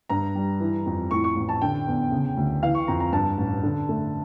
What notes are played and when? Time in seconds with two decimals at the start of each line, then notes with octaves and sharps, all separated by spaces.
0.09 G2 A#5
0.35 G3
0.60 E3
0.86 F2
1.11 A2 C#6
1.24 C#6
1.36 A1
1.49 A5
1.62 D3 G5
1.87 E2
2.11 C#3
2.37 D2
2.63 E3 F5
2.75 C#6
2.88 F2 A#5
3.00 A#5
3.12 G2 A5
3.38 A1
3.63 D3
3.89 A3